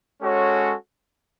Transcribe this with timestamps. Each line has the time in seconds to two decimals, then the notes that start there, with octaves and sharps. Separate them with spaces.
0.21 G#3 C#4 F#4 A4 C#5